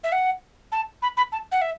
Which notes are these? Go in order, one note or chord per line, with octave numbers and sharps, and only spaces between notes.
E5
F#5
A5
B5
B5
A5
F#5
E5